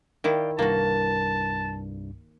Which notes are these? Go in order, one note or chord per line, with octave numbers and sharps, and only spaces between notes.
D#3 E4 D5 F5 G5
C2 G2 A#3 F#4 A5